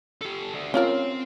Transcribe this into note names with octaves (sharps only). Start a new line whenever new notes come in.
G4 A4
D4 F#4
C4 C#4 F4 A#4